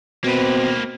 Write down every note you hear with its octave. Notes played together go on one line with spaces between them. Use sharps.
B2 A#3 C4 B4